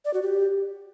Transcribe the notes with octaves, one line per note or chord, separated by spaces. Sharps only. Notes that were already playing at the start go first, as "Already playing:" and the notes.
D5
F#4
G4